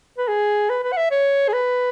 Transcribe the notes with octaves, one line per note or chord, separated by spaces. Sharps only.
B4
G#4
B4
B4
F#5
E5
C#5
G#4
B4